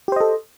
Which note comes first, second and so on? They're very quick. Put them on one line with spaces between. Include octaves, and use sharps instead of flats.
G4 C5 D#5 A4